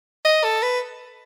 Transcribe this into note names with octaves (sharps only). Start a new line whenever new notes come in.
D#5
A4
B4